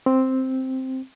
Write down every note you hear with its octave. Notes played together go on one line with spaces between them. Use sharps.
C4